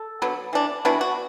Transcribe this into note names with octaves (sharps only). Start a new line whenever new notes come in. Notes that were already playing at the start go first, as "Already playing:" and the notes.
Already playing: A4
D3 F#3 B3
E3 D4
E3 B3 D4 F#4
F#4